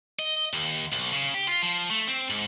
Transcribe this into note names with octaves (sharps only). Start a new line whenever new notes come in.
D#5
D#2
B1
C#3
G4
F4
F3
A3
C4
G#2